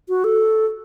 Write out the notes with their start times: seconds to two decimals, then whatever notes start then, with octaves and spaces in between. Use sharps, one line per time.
0.09 F#4
0.24 A4